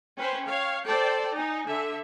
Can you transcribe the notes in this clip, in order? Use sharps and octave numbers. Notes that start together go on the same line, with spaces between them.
C#4 B4 C5 G5
C#5 F5
A4 C5 D5 G5
D#4 G#5
D3 E5